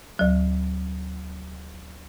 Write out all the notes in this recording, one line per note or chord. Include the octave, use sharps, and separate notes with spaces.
D2 F#3